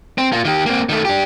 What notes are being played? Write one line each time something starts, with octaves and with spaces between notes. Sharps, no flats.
C4
A#3 F4
D#3 G4
A#3 C4
D#3 A3
D4 G4